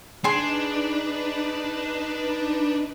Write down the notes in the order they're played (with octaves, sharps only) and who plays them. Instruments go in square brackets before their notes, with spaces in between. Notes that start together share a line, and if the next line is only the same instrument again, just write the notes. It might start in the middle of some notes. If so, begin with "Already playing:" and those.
[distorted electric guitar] D4 [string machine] D#4 B4 [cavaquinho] G#4 G#5 C6